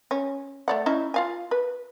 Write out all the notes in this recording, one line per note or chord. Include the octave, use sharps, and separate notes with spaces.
C#4
A3 D5 F#5
C#4 D#4 E4
F4 F5 G#5
B4